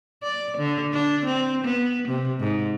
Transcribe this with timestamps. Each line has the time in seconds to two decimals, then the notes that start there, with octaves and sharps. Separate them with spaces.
0.23 D5
0.58 D3
0.93 D4
1.26 C4
1.65 B3
2.09 C3
2.41 G#2